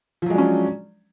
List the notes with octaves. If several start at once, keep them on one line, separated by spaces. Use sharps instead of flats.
F3 F#3 G#3 C#4 D4